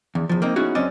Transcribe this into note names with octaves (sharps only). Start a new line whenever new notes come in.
E2
E2 F3
A#3 C4 D#4
B3 C#4 D#4 E4 F#4 G#4
F#2 C4 C#4 D5 D#5